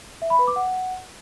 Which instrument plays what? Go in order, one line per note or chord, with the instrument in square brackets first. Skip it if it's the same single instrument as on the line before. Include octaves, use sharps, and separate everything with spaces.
[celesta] E5
B5
B4
D6
F#5